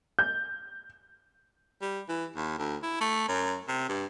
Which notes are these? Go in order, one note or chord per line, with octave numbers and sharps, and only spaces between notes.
G6
G3
E3
D#2
D2
E4
A3
F#2
C3
G2